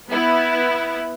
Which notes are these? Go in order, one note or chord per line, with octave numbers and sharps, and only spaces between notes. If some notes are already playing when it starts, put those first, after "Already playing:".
B3 E4